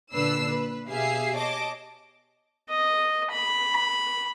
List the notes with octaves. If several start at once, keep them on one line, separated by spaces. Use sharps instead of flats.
A#2 D3 D4 B4 E6 C7
B4
B2 G4 G#4 E5 F5 C7
C#5 D#5 A5 D6
D#5
B5